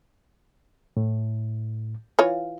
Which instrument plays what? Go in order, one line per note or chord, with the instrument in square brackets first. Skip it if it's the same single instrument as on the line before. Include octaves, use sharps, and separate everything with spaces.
[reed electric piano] A2
[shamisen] E3 F4 C#5